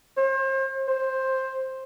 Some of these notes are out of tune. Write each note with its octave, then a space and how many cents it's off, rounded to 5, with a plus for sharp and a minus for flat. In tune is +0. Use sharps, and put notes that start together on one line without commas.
C5 +35
C5 +10